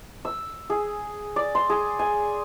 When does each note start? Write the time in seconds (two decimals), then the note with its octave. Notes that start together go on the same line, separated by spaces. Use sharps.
0.25 E6
0.70 G#4
1.36 D5
1.55 C6
1.70 G#4
1.99 G#5